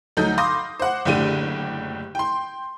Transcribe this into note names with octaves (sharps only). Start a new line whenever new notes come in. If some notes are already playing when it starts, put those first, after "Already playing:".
D2 F#3 D#4 A4 G6
F5 B5 C6 D6 D#6 A#6
C5 F#5
F#1 A2 D3 G4 D#7
G5 C6